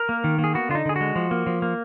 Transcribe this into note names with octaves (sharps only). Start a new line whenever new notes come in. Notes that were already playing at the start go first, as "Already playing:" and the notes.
Already playing: A#4
A#3
D#3
A#3
G#4
B3 F#4
D3 F4
D#4
D3 G#4
G#3 F#4
F3
A#3
F3
A#3